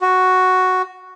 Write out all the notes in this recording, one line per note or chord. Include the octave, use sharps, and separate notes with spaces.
F#4